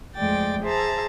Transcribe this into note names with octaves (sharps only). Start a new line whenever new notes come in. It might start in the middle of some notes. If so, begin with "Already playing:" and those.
F2 G#3 A3 D5 G5 A6
G#4 C5 E5 A5 A#5